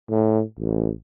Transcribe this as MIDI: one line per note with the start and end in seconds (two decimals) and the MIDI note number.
0.10 0.42 45
0.59 0.91 33